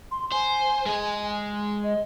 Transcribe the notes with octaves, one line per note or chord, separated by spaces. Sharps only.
C6
C5 G#5
G#3 G#4
D#5